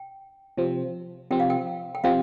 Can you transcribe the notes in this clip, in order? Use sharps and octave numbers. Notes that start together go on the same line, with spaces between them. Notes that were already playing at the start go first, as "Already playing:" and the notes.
Already playing: G5
C3 F3 C4
C3 F3 C4 G5
F5
G5
G5
C3 F3 C4 F5